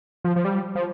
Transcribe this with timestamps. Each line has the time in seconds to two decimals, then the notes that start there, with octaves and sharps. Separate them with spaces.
0.24 F3
0.36 F3
0.45 G3
0.75 F3